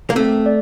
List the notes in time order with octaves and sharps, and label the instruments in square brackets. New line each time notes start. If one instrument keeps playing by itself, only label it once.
[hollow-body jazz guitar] A#3
[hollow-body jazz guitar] A3 [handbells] C4
[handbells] D5